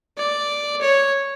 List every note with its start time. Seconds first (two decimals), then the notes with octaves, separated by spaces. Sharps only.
0.18 D5
0.81 C#5